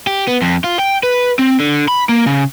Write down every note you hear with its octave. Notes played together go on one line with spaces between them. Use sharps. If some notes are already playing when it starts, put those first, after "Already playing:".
G4
B3
F2
F4
G5
B4
C4
D3
B5
A#3
C#3